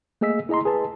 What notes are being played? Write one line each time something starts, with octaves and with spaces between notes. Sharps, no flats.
A3 A#3 G#4 D#5 E6 B6
E4 G#4 D#5 A#5 C6
G#4 B4 A5